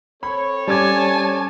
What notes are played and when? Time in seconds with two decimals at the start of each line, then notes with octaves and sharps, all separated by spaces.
0.23 C4 A4 C#5 B5
0.68 G3 C#4 G#5 A5 D6 G#6